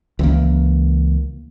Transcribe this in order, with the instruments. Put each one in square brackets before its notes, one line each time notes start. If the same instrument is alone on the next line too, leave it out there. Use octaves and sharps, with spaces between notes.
[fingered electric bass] C#2 E3 A#3